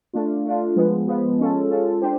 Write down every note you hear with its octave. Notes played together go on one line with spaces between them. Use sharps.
A3 D4 F4
A3 D4 F4
F3 G#3 B3
F3 G#3 B3
G#3 C#4 F4 A4
G#3 C#4 F4 A4
D4 G4 C5